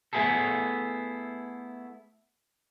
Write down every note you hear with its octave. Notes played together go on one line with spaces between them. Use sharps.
A3 B3 E4 G#4 A4